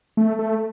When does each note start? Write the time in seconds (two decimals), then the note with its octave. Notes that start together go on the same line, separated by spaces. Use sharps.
0.17 A3
0.39 A3